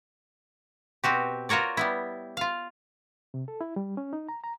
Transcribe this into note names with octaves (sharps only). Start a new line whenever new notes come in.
B2 C4 F#4 G4
F4 F#4 A#4 C#5 D5
G3 B3 E4
F4 F5
C3
A4
E4
G3
C#4
D#4
A#5
A#5